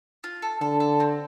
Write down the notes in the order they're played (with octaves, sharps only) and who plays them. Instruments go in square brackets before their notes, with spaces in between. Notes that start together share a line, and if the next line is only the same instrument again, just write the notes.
[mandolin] F4
A4
[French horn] D3 [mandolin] A4
[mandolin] A4
C4